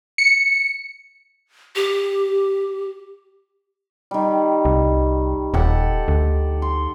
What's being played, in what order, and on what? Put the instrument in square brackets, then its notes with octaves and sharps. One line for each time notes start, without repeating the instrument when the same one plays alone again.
[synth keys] C#7
[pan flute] G4
[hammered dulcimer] D#3 G3
[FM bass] C2
[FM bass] D#1 [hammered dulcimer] G4 A4 F#5
[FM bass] D2
[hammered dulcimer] C6